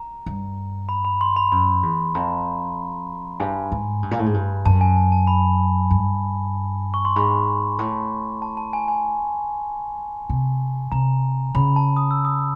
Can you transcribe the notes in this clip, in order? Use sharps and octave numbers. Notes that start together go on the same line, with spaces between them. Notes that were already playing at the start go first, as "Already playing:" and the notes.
Already playing: A#5
G2
B5
B5
C6
B5
F#2 B5
E2
F2 A#5
G2 G#5
G#2
G2
A#2
A2
G#2
G2
F#2 A5
G#5
A5
A5
B5
G2
C#6
C6
G#2 B5
A2
A5
A5
G#5
G#5
C3
C3 A#5
C#3 B5
A5
D#6
E6
D#6